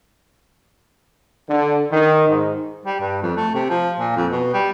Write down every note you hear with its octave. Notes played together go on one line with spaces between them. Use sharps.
D3
D#3
G#2
G3
G2
F2
A3
C3
F3
A#2
F2
B2
G3